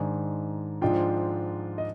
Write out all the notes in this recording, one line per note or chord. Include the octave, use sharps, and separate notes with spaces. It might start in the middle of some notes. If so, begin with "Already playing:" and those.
Already playing: G#2 D#3 G#3 D4 G#5
G#2 F3 G#3 D4 F4 G5
D#5